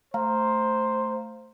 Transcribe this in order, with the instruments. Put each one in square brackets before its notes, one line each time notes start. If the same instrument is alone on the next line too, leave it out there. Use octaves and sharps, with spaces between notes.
[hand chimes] A3 F5 A#5 [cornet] C5